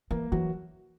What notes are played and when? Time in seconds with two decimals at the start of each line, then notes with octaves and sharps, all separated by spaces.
0.11 E3 A#3 A#4
0.32 E3 F#3 F#4